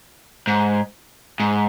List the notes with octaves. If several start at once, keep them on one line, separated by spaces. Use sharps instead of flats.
G#2
G#2